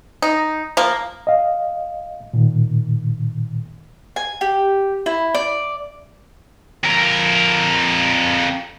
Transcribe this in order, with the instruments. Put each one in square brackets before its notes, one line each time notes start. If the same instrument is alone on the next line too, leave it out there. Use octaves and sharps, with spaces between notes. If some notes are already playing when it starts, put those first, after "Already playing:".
[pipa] D#4
F3 A#3
[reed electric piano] D#5 F5
A#2 D#3
[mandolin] G#5
G4
E4
D5
[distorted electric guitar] F2 A#4